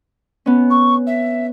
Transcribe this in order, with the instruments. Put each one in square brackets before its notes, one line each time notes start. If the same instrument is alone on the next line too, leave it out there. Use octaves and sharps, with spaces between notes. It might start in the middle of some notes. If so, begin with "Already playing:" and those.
[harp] B3 C#4
[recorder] C#6
E5